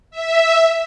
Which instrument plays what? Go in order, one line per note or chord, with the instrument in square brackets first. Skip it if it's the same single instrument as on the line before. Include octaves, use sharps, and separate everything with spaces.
[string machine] E5